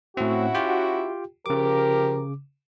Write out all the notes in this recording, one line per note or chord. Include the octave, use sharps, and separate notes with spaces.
A2 C4 C#4 E4 F#4
F4 G4 G5
C#3 F3 G4 A#4 D6